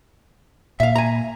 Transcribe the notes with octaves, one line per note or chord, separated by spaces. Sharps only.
A#2 E5 F5
G#5 A#5